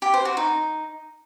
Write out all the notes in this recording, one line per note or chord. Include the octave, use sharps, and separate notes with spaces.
G4
C5
F#4
D#4